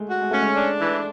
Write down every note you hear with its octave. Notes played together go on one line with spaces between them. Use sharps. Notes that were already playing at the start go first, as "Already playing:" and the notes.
Already playing: G#3 A3
F#4
G#3
A3 C#4
G#3
D4
E3